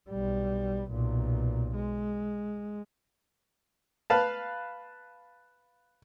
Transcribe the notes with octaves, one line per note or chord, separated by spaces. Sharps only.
B1 G3
B1 A#2
G#3
B4 F5 A5